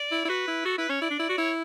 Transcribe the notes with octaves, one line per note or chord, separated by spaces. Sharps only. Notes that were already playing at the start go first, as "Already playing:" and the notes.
Already playing: D5
E4
E4
F#4 B4
E4
F#4 A4
E4 B4
C#4 C#5
E4 D5
D4
E4
F#4
E4 C#5